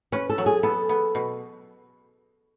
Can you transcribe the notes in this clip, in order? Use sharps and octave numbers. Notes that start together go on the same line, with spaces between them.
C#4 B4
A4
F#3
G#4
B3 A4
B3
B2